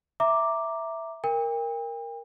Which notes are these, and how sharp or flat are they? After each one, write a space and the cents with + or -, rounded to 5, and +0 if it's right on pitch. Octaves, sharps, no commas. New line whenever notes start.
E5 +0 A#5 +0 D6 +0
A#4 +0 G5 +40